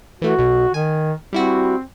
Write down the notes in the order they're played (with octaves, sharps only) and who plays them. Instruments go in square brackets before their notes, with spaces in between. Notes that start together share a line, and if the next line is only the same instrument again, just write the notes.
[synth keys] E3 A3 [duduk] F#4
[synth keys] B1 B2
[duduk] D#3 [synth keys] G#5
[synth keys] G3 E4 F#4 [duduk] C4